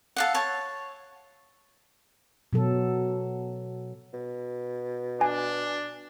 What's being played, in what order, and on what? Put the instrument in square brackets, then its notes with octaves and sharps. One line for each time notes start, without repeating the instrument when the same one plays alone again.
[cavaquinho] A4 F5 F#5
C#5 A5
[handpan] B2 F#3 A4
[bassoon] B2
[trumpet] D4 [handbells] G#5